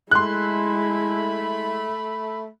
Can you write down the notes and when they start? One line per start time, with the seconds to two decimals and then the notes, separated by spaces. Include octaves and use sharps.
0.11 G#3 A3 E4 B5 C6 F#6